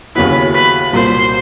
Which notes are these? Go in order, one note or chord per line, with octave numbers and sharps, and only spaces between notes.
D#2 C#3 F#3 B3 E4 B4
B4
C2 A#2 F#3 A#3 C5